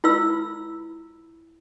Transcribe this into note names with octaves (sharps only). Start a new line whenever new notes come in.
E4 F4 B4 B5 E6